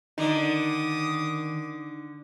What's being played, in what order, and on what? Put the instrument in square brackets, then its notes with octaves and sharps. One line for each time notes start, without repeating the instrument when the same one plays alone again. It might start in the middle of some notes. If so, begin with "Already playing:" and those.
[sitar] D3 [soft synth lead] D#3 [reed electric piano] D#4 [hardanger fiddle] D6 D#6